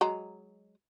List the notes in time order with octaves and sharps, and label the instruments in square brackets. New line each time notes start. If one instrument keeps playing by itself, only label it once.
[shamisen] F#3 G#3 A#5